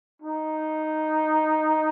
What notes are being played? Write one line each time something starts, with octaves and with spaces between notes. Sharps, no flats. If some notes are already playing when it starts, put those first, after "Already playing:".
D#4